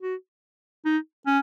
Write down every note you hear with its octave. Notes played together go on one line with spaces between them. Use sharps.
F#4
D#4
C#4